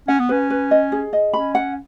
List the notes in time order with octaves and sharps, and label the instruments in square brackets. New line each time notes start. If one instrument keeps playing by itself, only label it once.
[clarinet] C#4 [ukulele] F#5
[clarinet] B3
[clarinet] C#4 [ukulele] B4
[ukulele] B4
D#5
G#4
D#5
[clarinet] C#4 [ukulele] B5
[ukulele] F#5